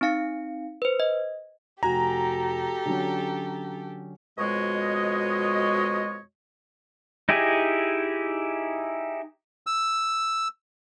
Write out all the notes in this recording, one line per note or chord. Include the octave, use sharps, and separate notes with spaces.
C4 D#4 F5 C#7
B4 C5
D#5
F1 F#4 G4 A4 G#5 A#5
D3 F#3 C#4
F2 B2 G#3 F#4 C#5 D#5
D#4 E4 G4 G#4
E6